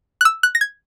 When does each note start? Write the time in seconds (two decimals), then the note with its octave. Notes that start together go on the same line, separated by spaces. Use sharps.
0.21 F#6
0.25 E6
0.43 F#6
0.55 A#6
0.61 G#6